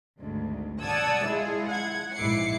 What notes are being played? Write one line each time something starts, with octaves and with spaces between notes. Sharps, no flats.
G#1 D2 G#2
D5 F#5 A5 D#6 E6 G#6
G#3 E4 F4 G#4
F#5 G#6
A#1 G#2 E4 D6 C7 C#7